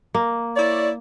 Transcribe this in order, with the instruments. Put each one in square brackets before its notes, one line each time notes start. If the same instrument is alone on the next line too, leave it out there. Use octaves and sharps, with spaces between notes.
[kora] A#3
[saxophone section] E4 C#5 D5